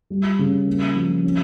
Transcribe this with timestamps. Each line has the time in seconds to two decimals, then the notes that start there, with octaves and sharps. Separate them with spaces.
0.10 G3
0.39 C#3
0.67 A#3
0.96 F3
1.24 C#4